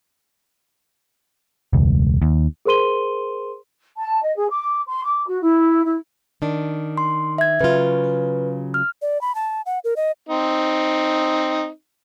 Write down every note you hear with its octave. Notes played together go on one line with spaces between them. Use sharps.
E1 C#2
D#2
G#4 A#4 C5 C6 D#7 G7
A5
D#5
G#4
D6
C6
D6
F#4
E4
E4
D#3 D4
C6
E5 G#6
C#3 F#3 F4 B4
F6
D5
B5
A5
F#5
A#4
D#5
C4 D#4